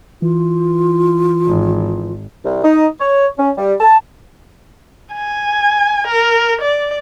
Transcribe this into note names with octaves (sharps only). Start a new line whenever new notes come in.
E3 F4
G#1
C2
D#4
C#5
C#4
G3
A5
G#5
A#4
D5